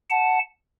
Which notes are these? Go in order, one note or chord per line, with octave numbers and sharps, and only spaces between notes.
F#5 A5